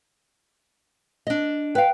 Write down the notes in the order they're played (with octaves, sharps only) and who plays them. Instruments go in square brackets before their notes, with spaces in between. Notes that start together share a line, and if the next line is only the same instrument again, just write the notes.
[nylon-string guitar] D4 D#5
[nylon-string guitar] B4 F5 [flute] G5